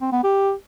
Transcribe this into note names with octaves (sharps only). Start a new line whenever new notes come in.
C4
B3
G4